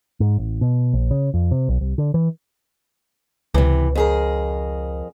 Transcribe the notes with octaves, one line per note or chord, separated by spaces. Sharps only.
G#2
A1
B2
A#1
C#3
F2
C3
B1
C2
D3
E3
C#2 C3 E3
F2 G#4 A#4